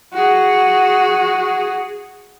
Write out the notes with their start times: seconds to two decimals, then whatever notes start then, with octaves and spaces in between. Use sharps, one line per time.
0.13 F#4 G#4